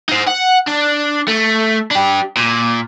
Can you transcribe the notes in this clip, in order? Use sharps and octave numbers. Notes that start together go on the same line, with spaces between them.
D#4 C5
F#5
D4
A3
D4 G4
A#2